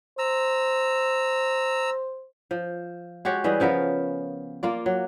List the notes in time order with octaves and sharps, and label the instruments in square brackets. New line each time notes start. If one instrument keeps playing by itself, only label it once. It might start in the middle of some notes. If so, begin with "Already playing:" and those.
[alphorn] C5 [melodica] A#5 E6
[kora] F3
G#3 F#4 G4 C#5
E3 G3 G#4 D#5
C#3 F3 B3 A#4
A#3 F4 D5
F#3